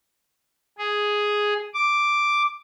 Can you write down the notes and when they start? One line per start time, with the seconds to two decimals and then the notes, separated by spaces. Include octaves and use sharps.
0.78 G#4
1.74 D6